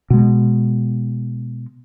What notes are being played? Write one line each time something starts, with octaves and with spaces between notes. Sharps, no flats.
B2 G#3